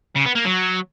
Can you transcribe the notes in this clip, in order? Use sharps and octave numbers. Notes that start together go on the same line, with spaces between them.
C#3
B3
A#3
F#3